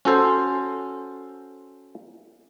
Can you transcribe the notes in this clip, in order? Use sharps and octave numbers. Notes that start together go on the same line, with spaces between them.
C#4 F#4 A4 C5